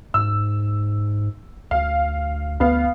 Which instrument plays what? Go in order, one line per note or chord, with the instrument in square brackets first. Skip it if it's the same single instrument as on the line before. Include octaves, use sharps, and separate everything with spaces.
[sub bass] G#2 [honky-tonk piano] E6
[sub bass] D2 [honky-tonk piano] F5
[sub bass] D2 [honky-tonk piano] B3 F5